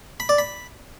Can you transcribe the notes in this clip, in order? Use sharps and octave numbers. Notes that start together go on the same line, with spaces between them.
B5
D5
B5